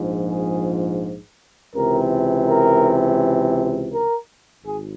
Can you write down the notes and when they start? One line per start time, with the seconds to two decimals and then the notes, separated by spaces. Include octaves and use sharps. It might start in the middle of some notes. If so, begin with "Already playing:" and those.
Already playing: A#1 G#2 F3
0.30 G#4
1.76 C#2 C3 E3 A#4
2.49 A#4
3.93 A#4
4.65 G#1 G#4